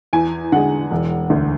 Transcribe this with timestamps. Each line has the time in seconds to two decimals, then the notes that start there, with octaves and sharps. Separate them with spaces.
0.13 E2 G#5
0.52 D3 G#3 F#5
0.91 E1
1.30 D2 D3